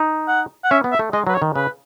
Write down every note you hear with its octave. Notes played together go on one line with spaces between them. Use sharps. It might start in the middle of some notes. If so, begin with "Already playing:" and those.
Already playing: D#4
F#5
F#5
C#4 E5
B3
E5
A3
G#3 D#5
F#3 B4
C#5
D#3
C#3 B4